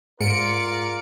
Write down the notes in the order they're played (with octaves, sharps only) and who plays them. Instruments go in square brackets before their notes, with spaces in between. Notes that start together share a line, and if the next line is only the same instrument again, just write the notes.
[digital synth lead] G#2 [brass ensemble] F4 A#4 D5 [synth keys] C#7 D7